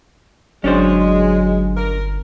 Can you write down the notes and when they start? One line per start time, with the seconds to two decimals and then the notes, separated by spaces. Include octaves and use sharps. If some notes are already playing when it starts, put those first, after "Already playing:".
0.64 G1 F#3 G#3 C#4 D4 C5
1.77 A#4